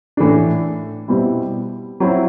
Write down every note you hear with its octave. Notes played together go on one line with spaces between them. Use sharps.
A2 E3 A3 D4
B2 G3 C4 E4
F#3 C4 E4